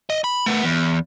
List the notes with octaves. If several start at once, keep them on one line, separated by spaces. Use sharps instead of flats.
D#5
B5
A3 B3
E2